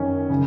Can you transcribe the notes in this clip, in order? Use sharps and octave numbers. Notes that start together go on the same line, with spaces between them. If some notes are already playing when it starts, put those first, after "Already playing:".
Already playing: F#2 D#3 C#4
C#3